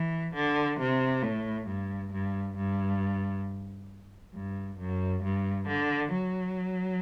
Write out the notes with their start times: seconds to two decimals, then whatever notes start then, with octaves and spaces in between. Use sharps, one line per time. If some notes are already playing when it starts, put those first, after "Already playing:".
Already playing: E3
0.34 D3
0.79 C3
1.23 A2
1.67 G2
2.12 G2
2.56 G2
4.34 G2
4.78 F#2
5.23 G2
5.67 D3
6.12 F#3